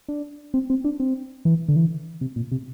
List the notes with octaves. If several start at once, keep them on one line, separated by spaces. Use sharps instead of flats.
D4
C4
C4
D4
C4
E3
D3
E3
C3
A#2
C3